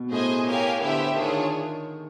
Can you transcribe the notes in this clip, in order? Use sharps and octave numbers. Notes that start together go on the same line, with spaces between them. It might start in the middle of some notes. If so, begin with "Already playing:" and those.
Already playing: B2
A2 G#4 C5 D#5 G#5
G4 A#4 C#5 F5 G#5
D3 B3 E4 G4 C5 E5
D#3 D4 F4 G#4 C#5